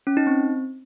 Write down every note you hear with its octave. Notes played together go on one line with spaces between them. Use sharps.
C#4
D#4
C4